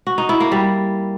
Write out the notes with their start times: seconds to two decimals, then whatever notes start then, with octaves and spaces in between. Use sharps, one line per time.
0.07 F#4
0.18 D#4
0.29 E4
0.40 A#3
0.52 G3